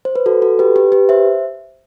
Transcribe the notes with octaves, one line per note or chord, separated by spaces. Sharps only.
C5
B4
F#4 A4
F#4 A4
G4 B4
G4 B4
G4 B4
C5 E5